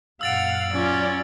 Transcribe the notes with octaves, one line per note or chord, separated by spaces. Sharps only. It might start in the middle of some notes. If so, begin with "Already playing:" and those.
F#2 A#2 F5 F#5 E6 A6 D7
F#3 C#4 F4 D5